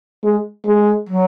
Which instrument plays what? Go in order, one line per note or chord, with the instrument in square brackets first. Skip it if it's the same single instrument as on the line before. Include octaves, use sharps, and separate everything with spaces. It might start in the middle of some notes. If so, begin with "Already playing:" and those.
[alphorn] G#3
G#3
[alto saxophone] F#3